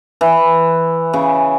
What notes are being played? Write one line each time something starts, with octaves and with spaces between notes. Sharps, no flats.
E3
C#3